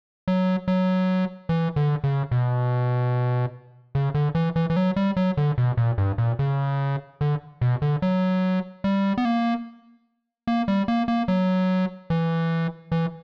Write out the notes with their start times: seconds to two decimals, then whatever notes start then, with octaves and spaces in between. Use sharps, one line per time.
0.28 F#3
0.68 F#3
1.49 E3
1.76 D3
2.04 C#3
2.31 B2
3.95 C#3
4.14 D3
4.35 E3
4.56 E3
4.70 E3
4.76 F#3
4.96 G3
5.17 F#3
5.37 D3
5.58 B2
5.77 A#2
5.98 G2
6.18 A#2
6.39 C#3
7.21 D3
7.61 B2
7.82 D3
8.02 F#3
8.84 G3
9.18 B3
9.25 A#3
10.47 A#3
10.68 G3
10.88 A#3
11.08 A#3
11.28 F#3
12.10 E3
12.92 E3